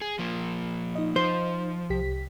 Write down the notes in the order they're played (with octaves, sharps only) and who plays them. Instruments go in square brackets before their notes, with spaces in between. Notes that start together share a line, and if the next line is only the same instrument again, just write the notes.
[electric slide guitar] G#4
F3 A#3
[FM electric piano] D#4 D#5
[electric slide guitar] F3 [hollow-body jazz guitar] C5
[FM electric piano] C2 G4 B6